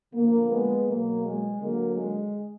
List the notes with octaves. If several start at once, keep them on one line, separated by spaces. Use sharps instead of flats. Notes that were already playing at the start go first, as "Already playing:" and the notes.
D3 F3 A#3
G#3 B3
B2 F#3 A#3
G#3
D3 F#3 A#3
G#3